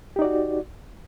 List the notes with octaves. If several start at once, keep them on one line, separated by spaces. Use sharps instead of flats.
D#4 F#4 G4 D5